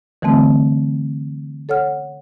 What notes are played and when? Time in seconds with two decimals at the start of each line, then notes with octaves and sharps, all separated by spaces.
0.22 D3 E3 G3 A3 C4
1.69 A4 C#5 F#5 F6